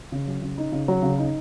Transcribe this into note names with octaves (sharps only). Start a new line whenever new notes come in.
C#3
F#3
C#3
D#4
C#3
F#3
C#3
D#4